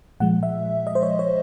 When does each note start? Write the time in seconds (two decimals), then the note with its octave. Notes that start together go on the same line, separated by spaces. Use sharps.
0.20 A#2 F3 G#3 F#5
0.43 E5
0.87 D#5
0.95 C5
1.03 C#5
1.19 C#5